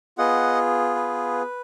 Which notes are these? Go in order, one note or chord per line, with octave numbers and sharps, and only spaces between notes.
B3 F4 G#4 D#5 F#5
B4